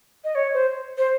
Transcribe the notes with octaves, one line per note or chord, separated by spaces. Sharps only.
D#5
C#5
C5
C5